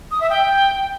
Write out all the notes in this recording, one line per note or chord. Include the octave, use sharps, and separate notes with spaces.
D#6
E5
G5